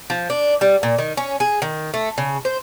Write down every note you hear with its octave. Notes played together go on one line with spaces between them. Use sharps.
F3
D4
G3
A#2
D#3
C#4
G#4
D#3
A3
C#3
C5